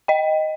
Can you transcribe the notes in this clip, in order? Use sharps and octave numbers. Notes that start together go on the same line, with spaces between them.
D#5 G5